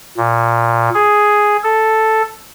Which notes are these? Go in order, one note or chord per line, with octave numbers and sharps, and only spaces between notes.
A#2
G#4
A4